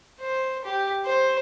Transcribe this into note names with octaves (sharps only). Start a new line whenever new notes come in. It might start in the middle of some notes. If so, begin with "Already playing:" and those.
C5
G4
C5